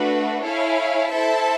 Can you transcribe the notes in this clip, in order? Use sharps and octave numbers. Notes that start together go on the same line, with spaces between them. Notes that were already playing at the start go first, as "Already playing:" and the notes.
Already playing: A3 D4 F#4 B4
E4 A4 C#5 F5 G#5
E4 A4 C5 E5 A5